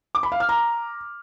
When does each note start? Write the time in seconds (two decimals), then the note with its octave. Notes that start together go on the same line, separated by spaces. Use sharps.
0.15 D6
0.23 B5
0.32 F5
0.40 F6
0.49 A#5